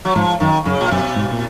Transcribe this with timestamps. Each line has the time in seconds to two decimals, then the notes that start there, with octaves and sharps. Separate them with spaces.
0.05 F#3
0.15 G#2 F3
0.40 F#2 D#3
0.65 F#2 C#3
0.81 A#2
0.91 F#2 B2
1.16 G#2
1.32 A#2